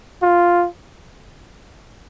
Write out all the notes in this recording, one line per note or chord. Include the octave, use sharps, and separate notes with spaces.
F4